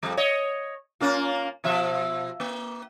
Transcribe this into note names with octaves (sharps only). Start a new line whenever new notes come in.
F2 G3
C#5 D#5
A#3 C#4 F4
B2 F3 E5
A#3